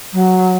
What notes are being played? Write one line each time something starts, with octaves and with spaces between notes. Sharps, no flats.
F#3